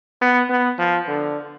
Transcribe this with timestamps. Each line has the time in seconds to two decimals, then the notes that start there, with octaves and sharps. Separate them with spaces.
0.21 B3
0.49 B3
0.78 F3
1.07 D3